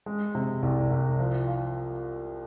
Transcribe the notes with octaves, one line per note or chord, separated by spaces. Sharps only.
G#3
C3
C2
C2
F3
F4